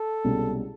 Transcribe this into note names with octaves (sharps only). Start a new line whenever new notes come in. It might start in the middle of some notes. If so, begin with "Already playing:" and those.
Already playing: A4
C2 B2 G#3 C#4